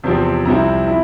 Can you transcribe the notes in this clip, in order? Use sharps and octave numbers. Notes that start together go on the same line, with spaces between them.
E2 C3 F3 C4
C2 C3 F3 C4 E4 A#5
E4